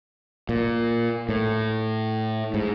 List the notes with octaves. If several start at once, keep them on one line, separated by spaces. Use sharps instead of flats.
A#2
A2
G#2